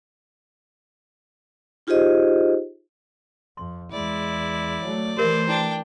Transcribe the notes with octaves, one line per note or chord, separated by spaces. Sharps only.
D#4 F4 G4 G#4 C5 D#5
F2 C6
E2 G#3 E4 D5
F#3 A3
E3 A3 G4 A#4 C5 E5
D4 E4 G5